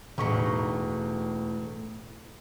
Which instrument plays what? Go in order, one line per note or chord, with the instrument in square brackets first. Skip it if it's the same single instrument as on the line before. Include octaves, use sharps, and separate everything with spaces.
[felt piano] E1 C#6 [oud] A2 D#4